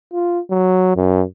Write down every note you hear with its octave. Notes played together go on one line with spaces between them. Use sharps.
F4
F#3
F#2